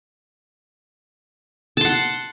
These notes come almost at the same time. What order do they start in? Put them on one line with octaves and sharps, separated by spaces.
A5 C6 F#5